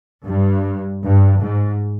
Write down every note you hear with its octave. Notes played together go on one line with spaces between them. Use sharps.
G2
G2
G#2